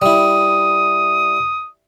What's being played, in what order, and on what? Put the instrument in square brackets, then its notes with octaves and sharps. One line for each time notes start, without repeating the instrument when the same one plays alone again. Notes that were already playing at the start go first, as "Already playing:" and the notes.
[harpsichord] G3 E4 [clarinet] D#6